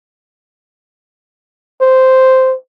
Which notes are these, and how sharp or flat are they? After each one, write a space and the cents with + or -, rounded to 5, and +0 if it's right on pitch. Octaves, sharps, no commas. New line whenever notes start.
C5 -5